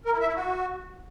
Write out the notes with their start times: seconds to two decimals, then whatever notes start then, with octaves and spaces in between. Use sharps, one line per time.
0.05 A#4
0.13 E4
0.20 E5
0.28 E4
0.35 F#4